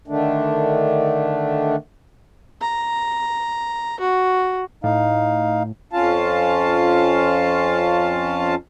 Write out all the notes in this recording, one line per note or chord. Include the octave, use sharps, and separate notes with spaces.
D3 D#3 A3 D4
A#5
F#4
A2 D#4 F5
F2 C#4 F4 F5 A5